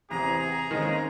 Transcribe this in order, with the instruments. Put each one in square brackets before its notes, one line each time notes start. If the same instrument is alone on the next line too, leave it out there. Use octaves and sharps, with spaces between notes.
[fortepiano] A1 [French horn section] E2 C3 [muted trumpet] G#4 [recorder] A#5
[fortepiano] D#3 G#3 C4 [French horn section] A#3 C#4 D#4